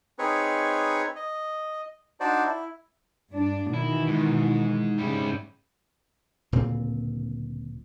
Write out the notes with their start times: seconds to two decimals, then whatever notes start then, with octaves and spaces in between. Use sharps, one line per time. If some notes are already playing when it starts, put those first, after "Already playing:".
0.19 C4 D#4 G#4 B4 C#5 C#6
1.16 D#5
2.20 D4 D#4 F#4 C5 D5
2.45 E4
3.30 G2 D4
3.74 B2 D#3 E3 E4
4.07 G#2
4.98 G#2 C#3 G3 E4
6.52 D1 A#2 C#3 C4